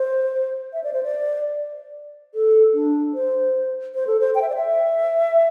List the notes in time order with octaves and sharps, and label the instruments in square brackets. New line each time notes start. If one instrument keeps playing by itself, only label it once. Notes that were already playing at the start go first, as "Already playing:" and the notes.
Already playing: [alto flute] C5
E5
D5
C5
D5
A4
D4
C5
C5
A4
C5
G5
E5
D5
E5